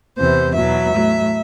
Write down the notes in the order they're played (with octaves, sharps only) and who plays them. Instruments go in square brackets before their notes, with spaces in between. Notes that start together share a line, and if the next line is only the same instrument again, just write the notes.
[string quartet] E2 C3 E3 C5
E2 B2 F#3 E5
A2 F#3